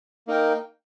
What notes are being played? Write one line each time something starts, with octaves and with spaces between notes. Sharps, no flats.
A#3 D#4 A#4 G5